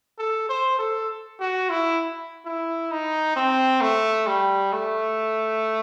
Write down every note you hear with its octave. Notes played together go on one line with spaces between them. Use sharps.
A4
C5
A4
F#4
E4
E4
D#4
C4
A3
G3
A3